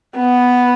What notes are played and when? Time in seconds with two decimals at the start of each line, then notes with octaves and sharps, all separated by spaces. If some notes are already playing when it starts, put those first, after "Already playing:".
0.18 B3